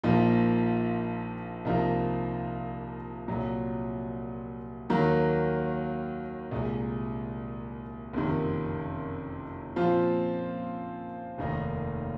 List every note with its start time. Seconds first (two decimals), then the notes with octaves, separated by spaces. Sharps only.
0.03 A#1 A#2 F3 A#3 D#4
1.65 C2 C3 F3 A#3 D#4
3.28 C2 A#2 F#3
4.90 D#2 D#3 F#3 A#3
6.52 C2 A#2 G#3
8.13 F#1 F2 C3 D#3
9.76 A#2 F3 C4 F4
11.38 F1 D#2 D#3 A#3 D#4